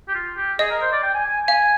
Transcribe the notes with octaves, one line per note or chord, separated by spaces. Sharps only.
G4
F4
G4
G#4 D#5
A#4
C5
D5
G5
G#5
G#5
G#5
F5 G#5